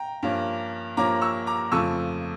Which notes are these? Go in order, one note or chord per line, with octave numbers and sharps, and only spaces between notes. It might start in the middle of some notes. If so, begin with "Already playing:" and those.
Already playing: G5 A#5
G2 F3 A#3 C#4
G2 F3 A#3 C#4 A#5 D6
C#6 E6
A#5 D6
F2 C#3 F3 A3 C#6 E6